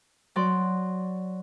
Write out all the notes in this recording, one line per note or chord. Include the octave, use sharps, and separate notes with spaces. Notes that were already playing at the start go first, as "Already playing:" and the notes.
F#3 D5 C6